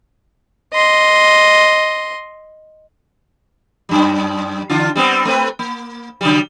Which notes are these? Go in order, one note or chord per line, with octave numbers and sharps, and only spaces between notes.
D#5 C6
F#2 G3
D3 D4 F4
G3 B3 C4
A3 C4 B4
A#3
C#3 F#3 G3